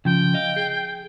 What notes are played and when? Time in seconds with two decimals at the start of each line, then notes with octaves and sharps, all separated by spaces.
0.05 C#3 F3 G5
0.34 D#5 F5
0.56 G#4